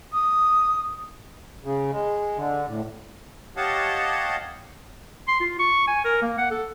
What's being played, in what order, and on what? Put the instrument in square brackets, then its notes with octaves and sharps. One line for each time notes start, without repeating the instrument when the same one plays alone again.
[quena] D#6
[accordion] C#3
G#3
D3
A2
G4 C#5 D#5 F5 F#5 A5
[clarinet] C6
F4
C#6
G#5
A#4
A#3
F#5
A4